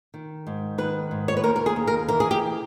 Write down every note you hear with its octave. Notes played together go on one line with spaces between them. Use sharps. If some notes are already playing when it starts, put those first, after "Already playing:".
D#3
G#2
D#3 B4
G#2
C#5
B4
D#2 A#4
A#4
G#4
D#2
A#4
E3 A#4
G#4
G4